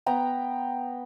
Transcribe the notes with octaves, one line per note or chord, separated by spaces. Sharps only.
B3 G5 A#5